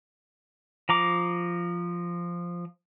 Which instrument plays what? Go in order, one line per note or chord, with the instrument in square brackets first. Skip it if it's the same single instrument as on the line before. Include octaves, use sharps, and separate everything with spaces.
[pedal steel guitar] F3 A#5 D6